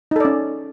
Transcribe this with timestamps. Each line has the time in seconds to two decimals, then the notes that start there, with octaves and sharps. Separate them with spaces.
0.11 D#4
0.16 A4
0.20 D5
0.25 C#4